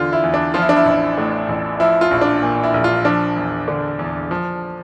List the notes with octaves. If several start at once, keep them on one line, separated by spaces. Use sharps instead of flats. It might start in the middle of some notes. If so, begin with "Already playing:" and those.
Already playing: E2 D3 F4
E4
E2
D4
F3 F4
E4
D4
E4
A1
A2
A1
F3 E4
F4
A#1
D4
A#2
E4
A#1
F4
F3 D4
E2
D3
E2
F3